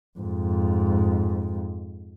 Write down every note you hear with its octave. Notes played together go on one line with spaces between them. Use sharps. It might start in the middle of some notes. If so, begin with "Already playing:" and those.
F2 G#2